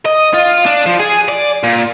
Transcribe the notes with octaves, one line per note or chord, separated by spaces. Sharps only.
D#5
F4
D4
F3
G#4
D5
A#2